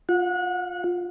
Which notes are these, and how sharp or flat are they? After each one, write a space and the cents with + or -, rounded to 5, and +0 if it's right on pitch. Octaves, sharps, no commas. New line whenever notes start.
F4 +15 F#5 -25